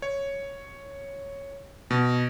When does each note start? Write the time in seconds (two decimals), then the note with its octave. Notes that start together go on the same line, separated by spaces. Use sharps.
0.02 C#5
1.91 B2